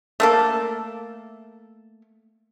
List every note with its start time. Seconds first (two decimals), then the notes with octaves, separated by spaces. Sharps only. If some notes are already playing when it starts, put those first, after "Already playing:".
0.20 A3 A#3 A4